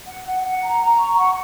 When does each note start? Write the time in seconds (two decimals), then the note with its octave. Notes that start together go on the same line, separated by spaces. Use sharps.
0.06 F#5
0.25 F#5
0.44 F#5
0.62 A#5
0.81 A#5
0.99 C#6
1.18 F#5